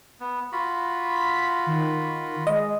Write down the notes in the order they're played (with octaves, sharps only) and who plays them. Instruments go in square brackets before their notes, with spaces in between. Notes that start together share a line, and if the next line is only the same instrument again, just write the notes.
[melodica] B3
F4 F#4 B5
[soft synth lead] B6
D#3
[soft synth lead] G#3 [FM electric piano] D#5